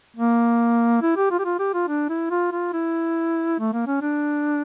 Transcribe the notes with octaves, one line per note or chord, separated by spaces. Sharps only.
A#3
E4
G4
F4
G4
F4
G4
F4
D4
E4
F4
F4
E4
A3
A#3
C#4
D4